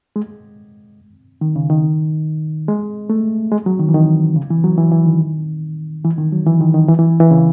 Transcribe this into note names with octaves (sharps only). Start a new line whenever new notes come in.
G#3
D#3
C#3
D#3
G#3
A3
G#3
F#3
D#3
E3
D#3
C#3
E3
F#3
E3
E3
D#3
E3
D#3
F#3
E3
D#3
D#3
E3
E3
E3
C#3